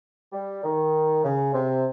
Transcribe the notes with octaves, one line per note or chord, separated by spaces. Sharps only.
G3
D#3
C#3
C3